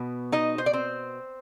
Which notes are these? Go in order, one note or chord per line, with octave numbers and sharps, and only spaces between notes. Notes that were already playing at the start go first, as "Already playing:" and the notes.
Already playing: B2 B3
D#4 D#5
C5
D5
C4 C5